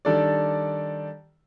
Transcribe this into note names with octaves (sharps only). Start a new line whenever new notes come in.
D#3 G3 D4 A4 D5